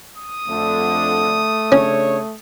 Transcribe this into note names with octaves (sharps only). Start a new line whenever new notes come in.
D#6
F2 D3 A3
C#3 C#4 D4 C#5